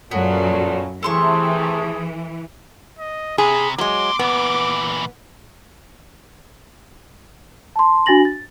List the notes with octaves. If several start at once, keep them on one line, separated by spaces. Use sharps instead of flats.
F#2 A#2 C#3 F#3 B3 C#4 A4
C3 E3 A3 G#4 A4 C6 C#6
D#5
C3 G#4 B5
F#3 G#3 A#3 C6 D6
A#2 E3 B3
A5 C6
D4 F#4 G#5 A6 A#6 F#7
A6